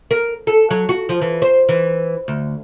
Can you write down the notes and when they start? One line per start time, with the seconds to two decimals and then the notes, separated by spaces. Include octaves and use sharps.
0.11 A#4
0.47 A4
0.70 F#3
0.89 F#4
1.09 F3
1.22 E3
1.42 C5
1.69 E3
2.28 D2